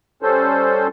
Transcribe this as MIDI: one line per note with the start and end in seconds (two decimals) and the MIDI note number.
0.22 0.87 55
0.22 0.87 61
0.22 0.87 69
0.22 0.87 72